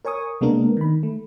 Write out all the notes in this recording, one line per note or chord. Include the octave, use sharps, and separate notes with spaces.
A#4 C#5 G#5 C#6 D#6
C3 G#3 A#3 B3 D4 A#4
D#3 B5
A3